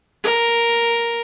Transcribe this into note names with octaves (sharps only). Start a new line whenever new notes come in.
A#4